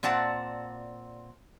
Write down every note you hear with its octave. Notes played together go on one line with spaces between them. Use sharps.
A#2 C4 D5 F#5 A5